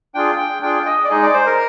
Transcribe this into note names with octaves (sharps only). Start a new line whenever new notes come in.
D4 F4 G#4 G5
G5
D4 F4 G#4 G5
D#5
D5
G#3 D#4 G#4 D#5
D5
C5
A#4